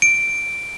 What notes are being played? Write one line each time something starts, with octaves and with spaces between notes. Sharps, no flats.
D7